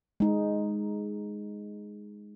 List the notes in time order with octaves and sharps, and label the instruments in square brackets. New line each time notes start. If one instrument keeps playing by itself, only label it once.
[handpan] G#3 D#4